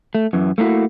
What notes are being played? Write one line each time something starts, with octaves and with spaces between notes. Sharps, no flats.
A3
F#2 E3
A3 A#3 C4 E4 F#4